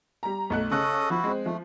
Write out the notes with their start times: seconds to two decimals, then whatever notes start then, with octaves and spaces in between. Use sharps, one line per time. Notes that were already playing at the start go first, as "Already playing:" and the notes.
0.23 G3 A#5
0.50 B1 A3 F#6
0.71 C#3 C#4 A4 D#5 C#6 F#6
1.10 F3 E4 F#4
1.24 G#3 C4
1.46 F3 A3